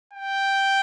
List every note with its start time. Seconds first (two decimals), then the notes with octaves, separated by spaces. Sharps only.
0.13 G5